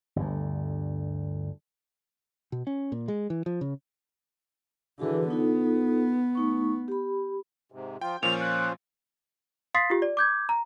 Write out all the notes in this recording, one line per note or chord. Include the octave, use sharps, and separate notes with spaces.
G1 D2
B2
C#4
A#2
G#3
E3
F3
C#3
D3 E3 F#4 G#4 B4
B3 D#4 F4 A4
A3 D#4 C#6
G4 B5
G#2 C3
F3 F4 G5
A#2 F3 C#4 F4 C5 F7
F#6
F5 C6 D#6 A6 B6 C7
F4 G4
D5
D6 G6 G#6
A#5